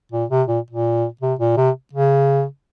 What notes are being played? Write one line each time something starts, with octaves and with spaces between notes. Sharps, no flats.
A#2
C3
A#2
A#2
C3
A#2
C3
C#3